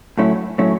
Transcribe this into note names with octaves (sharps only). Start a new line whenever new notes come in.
A2 F#3 A3 C#4 E4
A2 F#3 A3 C#4 E4